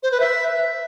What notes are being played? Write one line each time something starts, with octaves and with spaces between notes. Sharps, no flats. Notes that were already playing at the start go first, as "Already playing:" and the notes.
C5
B4
E5